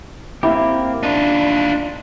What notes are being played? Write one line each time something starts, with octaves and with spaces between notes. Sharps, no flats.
A#3 C4 E4 G4
D4 D#4 F4